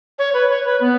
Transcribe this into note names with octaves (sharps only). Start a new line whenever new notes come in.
C#5
B4
C#5
B4
B3